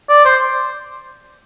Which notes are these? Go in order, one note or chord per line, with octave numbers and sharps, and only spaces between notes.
D5
C5